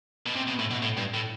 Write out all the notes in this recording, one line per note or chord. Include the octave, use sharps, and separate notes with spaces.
B2
C3
B2
A2
B2
A2
G2
A2